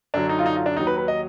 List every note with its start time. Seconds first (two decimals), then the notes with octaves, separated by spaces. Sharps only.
0.14 F#2 D3 F#3 D4
0.29 D#4
0.39 F4
0.46 D#4
0.56 F4
0.66 D4
0.76 D#2 D#3 F#3 D#4
0.87 B4
0.98 B4
1.08 D#5